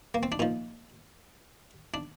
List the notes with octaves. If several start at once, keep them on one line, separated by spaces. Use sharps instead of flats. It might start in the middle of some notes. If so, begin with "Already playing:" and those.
A#3
C4
D4
A#2 F3 D#4
D4